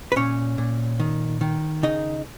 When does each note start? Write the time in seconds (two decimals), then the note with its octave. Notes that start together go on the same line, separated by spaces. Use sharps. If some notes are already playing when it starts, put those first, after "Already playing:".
0.12 B4
0.16 A#2 C#4 C#5
0.58 A#2
1.00 D#3
1.41 D#3
1.83 C#3 D#4 D#5